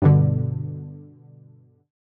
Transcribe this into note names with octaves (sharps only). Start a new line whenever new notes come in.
G2 B2 D3